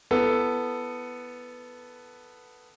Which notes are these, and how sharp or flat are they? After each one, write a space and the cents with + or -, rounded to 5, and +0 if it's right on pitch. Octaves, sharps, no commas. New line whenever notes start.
B3 +0 E4 +30 A4 +5